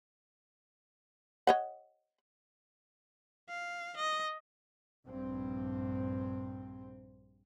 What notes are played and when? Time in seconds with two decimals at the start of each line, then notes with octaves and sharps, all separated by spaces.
1.47 C#5 D#5 F#5
3.48 F5
3.96 D#5
5.07 A#1 G2 C4